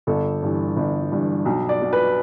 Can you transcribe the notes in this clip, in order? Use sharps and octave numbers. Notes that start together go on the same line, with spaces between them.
G1 A4
G2 E3
G1
G2 E3
B1
D5
B2
B4